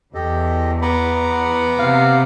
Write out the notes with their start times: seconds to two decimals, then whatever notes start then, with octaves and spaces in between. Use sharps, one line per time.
0.14 E2 G4 A4 D#5
0.82 B3 F#5 A#5 D6
1.79 C3 F5